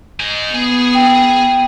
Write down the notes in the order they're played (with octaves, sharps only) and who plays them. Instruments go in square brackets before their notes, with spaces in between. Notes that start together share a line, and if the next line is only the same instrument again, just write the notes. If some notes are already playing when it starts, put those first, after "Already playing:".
[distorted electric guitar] D#4 G#5
[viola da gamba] B3 [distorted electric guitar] G#4
[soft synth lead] G5